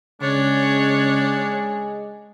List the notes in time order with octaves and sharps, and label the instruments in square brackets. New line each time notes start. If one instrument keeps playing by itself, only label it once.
[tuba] C#3 [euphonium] G#3 [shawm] D4 [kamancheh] C#5